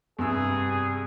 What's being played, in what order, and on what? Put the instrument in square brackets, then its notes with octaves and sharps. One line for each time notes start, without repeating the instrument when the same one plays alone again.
[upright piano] G2 C3 E6 [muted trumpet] G#4